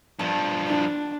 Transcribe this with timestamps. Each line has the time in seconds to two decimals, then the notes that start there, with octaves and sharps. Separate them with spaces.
0.19 G2 F3 B3 A5
0.68 D4